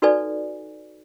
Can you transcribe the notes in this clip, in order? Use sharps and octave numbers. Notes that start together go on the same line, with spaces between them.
D#4 F#4 A4 B4 D5 G#5